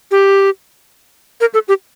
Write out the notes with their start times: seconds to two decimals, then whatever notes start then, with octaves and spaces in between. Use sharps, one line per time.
0.11 G4
1.41 A#4
1.54 A4
1.68 G4